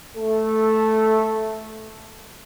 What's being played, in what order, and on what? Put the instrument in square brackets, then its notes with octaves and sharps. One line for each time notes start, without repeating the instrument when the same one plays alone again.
[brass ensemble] A3 A4